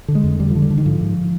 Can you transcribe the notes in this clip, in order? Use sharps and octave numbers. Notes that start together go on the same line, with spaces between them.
D3
G#3
F2
D3 G3
D3 F3
G3
D3
D#3
G#2 F3
G#2